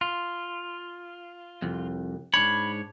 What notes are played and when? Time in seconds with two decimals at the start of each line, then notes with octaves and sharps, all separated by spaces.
0.01 F4
1.62 C2 F2
2.34 G#2 D4 C#5 B5